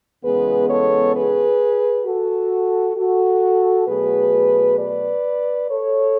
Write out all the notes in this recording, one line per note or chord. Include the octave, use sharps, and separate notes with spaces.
E2 C#3 G#3 B3 G#4 B4
A4 C#5
G#4 B4
F#4 A4
F#4 A4
B2 F#3 A3 G#4 B4
B4 D5
A4 C#5